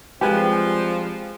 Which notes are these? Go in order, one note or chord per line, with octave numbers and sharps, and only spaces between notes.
F3 G3 G#3 C4 G4 B4 G#5